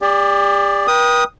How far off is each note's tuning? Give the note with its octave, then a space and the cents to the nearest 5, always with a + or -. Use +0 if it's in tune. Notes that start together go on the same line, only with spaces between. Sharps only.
G4 +40 D5 +0
B4 -45 G5 +0 D#6 +0